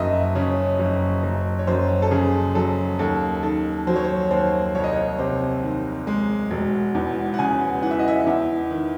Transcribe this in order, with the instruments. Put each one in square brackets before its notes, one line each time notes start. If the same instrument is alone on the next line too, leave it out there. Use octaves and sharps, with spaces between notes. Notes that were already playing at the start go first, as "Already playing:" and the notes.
Already playing: [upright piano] F#1 F#2 D#5 E5
C#3 C#5
F#1
F#1
C#5
F#2 C5
A4
C#3 G#4
F#3 A4
D#2 A4
D#3 A4
F#3 C5
C#5
C5
D#2 C5
C2 C#5
D#5
C#5
C3 C5
D#3
G#3
E1
E2
F#5
C#3 G#5
E3 F#5
E5
D#5
E5
E2
D#3